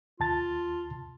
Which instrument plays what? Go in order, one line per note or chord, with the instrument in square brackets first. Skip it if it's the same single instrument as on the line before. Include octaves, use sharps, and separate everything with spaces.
[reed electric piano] D#2 A5 A6 [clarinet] F4